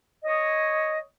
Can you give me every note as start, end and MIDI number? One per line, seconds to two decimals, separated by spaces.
0.25 1.00 73
0.25 1.00 75